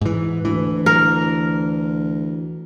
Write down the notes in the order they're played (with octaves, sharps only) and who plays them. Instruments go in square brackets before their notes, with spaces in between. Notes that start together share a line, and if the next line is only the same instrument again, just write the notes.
[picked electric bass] G#2 E3
[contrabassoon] D2 [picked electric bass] E3
[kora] A#4